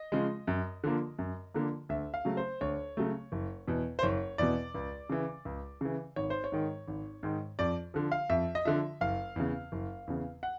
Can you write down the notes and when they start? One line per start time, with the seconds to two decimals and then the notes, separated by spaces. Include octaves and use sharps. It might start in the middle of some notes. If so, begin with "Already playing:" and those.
Already playing: D#5
0.12 C#3 F3 G#3
0.47 F#2
0.84 D3 F3 A#3
1.19 F#2
1.54 D3 F3 A#3
1.89 D2 E5
2.14 F5
2.25 C#3 F#3 A3
2.37 C5
2.61 D2 C#5
2.97 C#3 F#3 A3
3.32 F#1
3.68 E2 B2
3.99 C5
4.03 F#1 C#5
4.38 E2 B2 D5
4.74 C#2
5.09 C#3 E3
5.45 C#2
5.81 C#3 E3
6.16 G#1 C#5
6.30 C5
6.44 C#5
6.52 G#2 D#3
6.88 G#1
7.23 G#2 D#3
7.59 F2 D5
7.94 D3 F3
8.12 F5
8.29 F2 E5
8.55 D#5
8.65 D3 F3 E5
9.01 F#1 F5
9.36 E2 C#3
9.72 F#1
10.07 E2 C#3
10.43 F#5